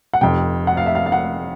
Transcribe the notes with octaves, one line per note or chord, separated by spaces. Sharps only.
F#5
F1 F2 C3 G5
F#5
F5
E5
F5
F5
F#5